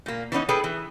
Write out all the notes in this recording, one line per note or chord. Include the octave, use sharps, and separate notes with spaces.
A#2 A#3
E3 B3 C#4 D#4
G#4 A4 B4 G5
E3